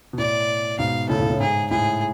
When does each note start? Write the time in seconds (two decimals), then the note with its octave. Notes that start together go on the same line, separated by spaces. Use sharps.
0.13 B2
0.18 A2 D5
0.79 G#2 B2 F5
1.09 A2 C#3 A4
1.20 A2 C#3
1.30 A2
1.40 G#2 G#4
1.70 A2 G#4